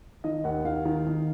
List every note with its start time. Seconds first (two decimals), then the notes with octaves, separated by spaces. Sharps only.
0.24 D#3 D#5
0.44 D#2 F#5
0.65 D#3 F5
0.85 D#3
1.07 D#3